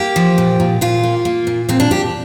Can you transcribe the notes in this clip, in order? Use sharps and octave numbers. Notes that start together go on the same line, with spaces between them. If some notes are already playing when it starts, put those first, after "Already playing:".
Already playing: A#3 G4
F3
A#2
A#2
A#2 F4
A#3
A#3
A#2
A#2 C4
D4
A#2 G4